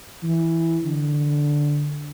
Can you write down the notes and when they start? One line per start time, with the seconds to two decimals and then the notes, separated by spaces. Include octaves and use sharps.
0.23 E3
0.84 D3